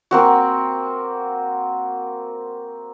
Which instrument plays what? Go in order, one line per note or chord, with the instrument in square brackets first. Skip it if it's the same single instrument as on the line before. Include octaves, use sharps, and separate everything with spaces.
[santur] A#3 C4 F#4